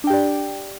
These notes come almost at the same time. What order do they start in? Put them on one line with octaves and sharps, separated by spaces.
D4 G5 G4 D5